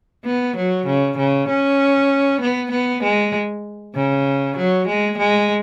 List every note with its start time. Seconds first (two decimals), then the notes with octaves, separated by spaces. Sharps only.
0.25 B3
0.57 F#3
0.87 C#3
1.18 C#3
1.49 C#4
2.42 B3
2.71 B3
3.03 G#3
3.95 C#3
4.58 F#3
4.88 G#3
5.18 G#3